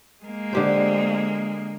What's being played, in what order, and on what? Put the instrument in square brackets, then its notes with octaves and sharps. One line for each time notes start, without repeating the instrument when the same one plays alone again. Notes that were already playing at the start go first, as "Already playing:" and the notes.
[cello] G#3 A#3
[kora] D3 G4 C5